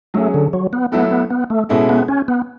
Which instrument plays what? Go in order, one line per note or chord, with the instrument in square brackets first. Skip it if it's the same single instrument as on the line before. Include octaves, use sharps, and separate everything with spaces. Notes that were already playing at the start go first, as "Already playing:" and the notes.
[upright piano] F#3 C#4 G#4 [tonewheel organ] A3
[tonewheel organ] D3
F#3
B3
[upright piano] F#3 A3 E4 A4 [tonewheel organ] B3
[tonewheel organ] B3
B3
A3
[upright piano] B2 G#3 C#4 E4 A4
[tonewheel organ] B3
C#4
B3